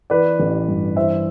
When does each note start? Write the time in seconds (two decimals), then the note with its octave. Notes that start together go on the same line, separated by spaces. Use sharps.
0.10 E3 B4 D5
0.40 A1
0.68 G2
0.96 E3 C5 E5